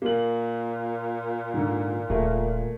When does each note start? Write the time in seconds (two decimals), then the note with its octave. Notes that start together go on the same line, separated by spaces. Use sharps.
0.02 A#2 A#3 F#7
1.54 G#2 D3
2.10 D#1 A3 G#4 A#4